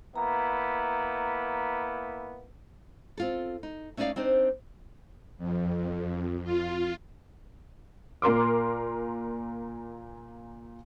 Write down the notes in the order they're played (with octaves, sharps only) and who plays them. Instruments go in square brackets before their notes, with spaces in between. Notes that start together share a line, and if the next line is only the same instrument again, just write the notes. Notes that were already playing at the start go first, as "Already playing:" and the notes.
[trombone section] A#3 B3 E4 [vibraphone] A#5
[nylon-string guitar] C4 F4 A4
D#4
A3 C#4 D#4 C5 D5 F5
C4 D4 D#4 C5
[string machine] F2
F4
[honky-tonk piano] A#2 A#4 C6 D6